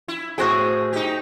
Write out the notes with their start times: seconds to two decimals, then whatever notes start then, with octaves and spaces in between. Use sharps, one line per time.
0.08 E4
0.38 A2 F#4 G#4 C5 G5
0.93 D#4 G4